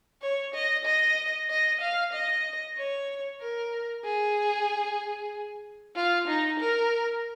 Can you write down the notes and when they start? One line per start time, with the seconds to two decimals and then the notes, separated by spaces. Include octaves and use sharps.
0.22 C#5
0.55 D#5
0.86 D#5
1.50 D#5
1.81 F5
2.13 D#5
2.78 C#5
3.42 A#4
4.05 G#4
5.96 F4
6.28 D#4
6.60 A#4